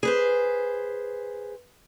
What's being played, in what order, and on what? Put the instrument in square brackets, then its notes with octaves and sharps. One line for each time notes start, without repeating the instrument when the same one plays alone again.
[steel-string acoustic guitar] G#4 B4 C5